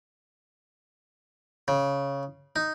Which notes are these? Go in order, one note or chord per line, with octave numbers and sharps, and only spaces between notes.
C#3
D#4